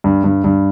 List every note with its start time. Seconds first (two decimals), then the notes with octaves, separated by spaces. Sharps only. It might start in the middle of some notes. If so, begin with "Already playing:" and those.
0.04 G2
0.24 G2
0.44 G2